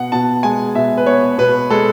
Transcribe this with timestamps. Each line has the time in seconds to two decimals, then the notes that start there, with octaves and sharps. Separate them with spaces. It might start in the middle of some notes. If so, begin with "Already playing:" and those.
Already playing: B2 B3 F#5
0.12 B2 A5
0.43 G#3 G#5
0.75 B2 E5
0.97 B4
1.06 B3 C#5
1.38 B2 B4
1.70 G#3 A4